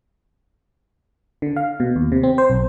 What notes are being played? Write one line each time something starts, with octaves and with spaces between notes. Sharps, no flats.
D3
F5
B2
D#2
C3
C4
C5
B1